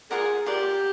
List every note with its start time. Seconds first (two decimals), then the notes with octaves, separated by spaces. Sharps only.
0.11 F4 G#4 A#4 D5 F#5
0.46 F4 G4 A#4 D5 F#5